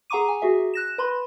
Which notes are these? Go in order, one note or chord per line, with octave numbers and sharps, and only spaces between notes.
G#4 F#5 A#5 C#6 D6 D#7
G#5
F#4 G#4 E5
F#6 A#6 E7
B4 B5 C6